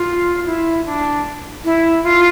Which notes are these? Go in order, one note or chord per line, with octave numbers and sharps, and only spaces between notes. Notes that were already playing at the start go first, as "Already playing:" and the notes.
Already playing: F4
E4
D4
E4
F4